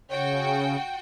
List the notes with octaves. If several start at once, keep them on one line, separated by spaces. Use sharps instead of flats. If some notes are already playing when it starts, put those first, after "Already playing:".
C#3 F#4 C#5 G5